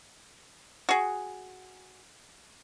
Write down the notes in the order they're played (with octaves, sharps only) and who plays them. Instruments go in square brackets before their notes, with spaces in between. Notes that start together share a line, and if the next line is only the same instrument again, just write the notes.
[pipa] F#4 G#4